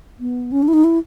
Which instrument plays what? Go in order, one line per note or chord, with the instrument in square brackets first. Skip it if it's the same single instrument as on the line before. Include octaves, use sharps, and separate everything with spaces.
[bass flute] B3
C#4
D4
E4
D#4
E4